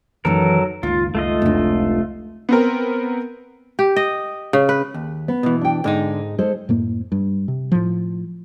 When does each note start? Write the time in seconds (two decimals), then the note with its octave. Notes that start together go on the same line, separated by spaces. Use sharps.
0.25 F#2 D#3 E3 F#3 A4 A#4
0.83 F#1 C#2 D#3 F4
1.15 C#2 A3 F4 D#5
1.42 F1 D4
2.49 B3 C4 A#4
3.79 G4
3.96 D#5
4.53 C#3
4.69 B4
4.94 D#2
5.28 B3
5.43 B2 E3
5.61 D4 G5
5.84 G#2 D3 G#3 D#4
6.38 G#3 A4 C5
6.69 F#2 A2 A#3
7.12 G2
7.48 C3
7.72 A2 F3